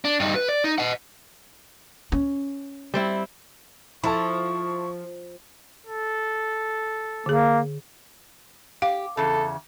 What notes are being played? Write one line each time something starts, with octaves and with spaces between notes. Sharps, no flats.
D4
G2 D#4
B4
D5
D#4
D#5 F#5
C#4
G3 C4 E4
F3 E4 A4 A5 C#6
A4
D3 A#3 G#4
G4 F5
E2 C#3 A4